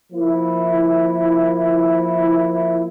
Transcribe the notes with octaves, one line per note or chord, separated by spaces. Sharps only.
F3 A#3 E4